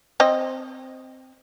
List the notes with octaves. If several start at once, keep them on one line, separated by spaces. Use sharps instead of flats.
C4 D#5